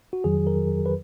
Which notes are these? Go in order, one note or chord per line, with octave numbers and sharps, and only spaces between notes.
F#4
F2 D#3 F#3 G#4
A#4
B4